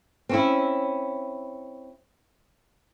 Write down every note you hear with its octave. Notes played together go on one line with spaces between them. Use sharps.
C4 C#4 E4